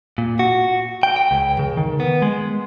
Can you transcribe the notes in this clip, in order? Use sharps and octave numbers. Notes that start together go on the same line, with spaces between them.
A#2
F#4
G5
G5
C#2
C#3
D#3
B3
G#3